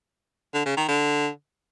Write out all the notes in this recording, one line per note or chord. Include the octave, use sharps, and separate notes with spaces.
D3
C#3
D#3
D3